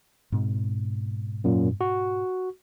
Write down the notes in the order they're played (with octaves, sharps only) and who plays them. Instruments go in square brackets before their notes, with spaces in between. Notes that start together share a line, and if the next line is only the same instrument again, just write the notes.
[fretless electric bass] G#2 B2 C4
[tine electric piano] F#2 A#2
F#4